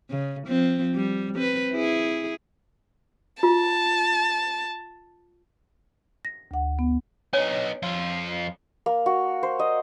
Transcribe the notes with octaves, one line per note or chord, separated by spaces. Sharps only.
C#3
F3 C4
G3
C4 B4
E4 G#4
F4 A5
A#6
D2 F#5
B3
B3 D4 D#4 C#5 G#5
F2 F4
A#3
F#4
C5
D#5